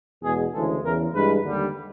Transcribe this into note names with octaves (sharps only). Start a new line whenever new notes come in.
E2 B2 G#3 G#4
D2 C#3 E3 G#3 A4
E2 C#3 E3 A#4
G2 E3 G#3 B4
D#2 D3 G3